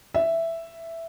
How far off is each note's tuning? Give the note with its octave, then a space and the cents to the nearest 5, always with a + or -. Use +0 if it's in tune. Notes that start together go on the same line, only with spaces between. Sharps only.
E5 +5